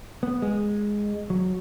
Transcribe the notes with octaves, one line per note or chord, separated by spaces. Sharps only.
B3
G#3
F#3